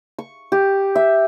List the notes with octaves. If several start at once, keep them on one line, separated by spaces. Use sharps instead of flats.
C#6
G4
E5